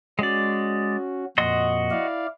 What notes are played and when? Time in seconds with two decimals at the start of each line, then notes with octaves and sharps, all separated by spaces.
0.19 G#3 C#4 F#4 D5
1.38 F2 A#2 F#4 D#5 C6
1.91 E4 D5 F5